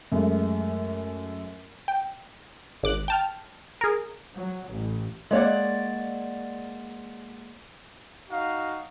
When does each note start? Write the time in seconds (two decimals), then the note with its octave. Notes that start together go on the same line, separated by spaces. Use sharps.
0.12 F#2 G#3 A3
1.88 G5
2.83 G#1 D6 F#6
3.08 G5 A5 F6
3.81 G#4 A#4
4.34 F#3
4.71 A1
5.31 G#3 A#3 C#5 D5 F#5
8.30 D#4 F#4 F5